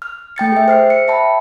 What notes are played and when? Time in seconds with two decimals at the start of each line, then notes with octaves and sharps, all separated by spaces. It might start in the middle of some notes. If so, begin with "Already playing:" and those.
0.02 F6
0.36 A3 G5 A6 C#7
0.52 G#4 E5
0.68 C5 F6 C7
0.90 C#7
1.08 E5 G5 A5 B5